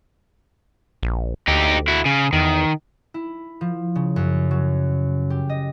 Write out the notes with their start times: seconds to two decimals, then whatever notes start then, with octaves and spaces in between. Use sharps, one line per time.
1.03 A#1
1.48 D2 D#4 G4
1.88 E4 F#4
2.06 C#3
2.33 E2 D#3
3.14 E4
3.61 F3
3.96 C#3
4.16 F#2
4.51 F#3
5.30 G4
5.49 D#5